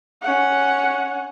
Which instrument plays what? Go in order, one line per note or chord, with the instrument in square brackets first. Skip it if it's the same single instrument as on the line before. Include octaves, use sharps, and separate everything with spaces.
[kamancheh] C#4 F#5